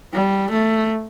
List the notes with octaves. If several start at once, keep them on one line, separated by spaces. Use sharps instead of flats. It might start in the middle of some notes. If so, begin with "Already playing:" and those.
G3
A3